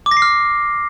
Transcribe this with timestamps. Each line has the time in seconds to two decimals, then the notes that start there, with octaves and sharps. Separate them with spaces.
0.06 D6
0.11 A#6
0.17 C7
0.22 F6